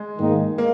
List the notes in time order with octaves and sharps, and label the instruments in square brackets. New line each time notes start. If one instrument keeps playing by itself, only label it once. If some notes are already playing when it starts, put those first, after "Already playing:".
Already playing: [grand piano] G#3
[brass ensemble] G#2 D#3 A#3 D#4
[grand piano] A#3